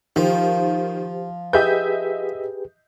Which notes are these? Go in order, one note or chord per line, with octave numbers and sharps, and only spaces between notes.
D#3 F3 G4 C5
G4 G#4 B4 D#5 E5 G6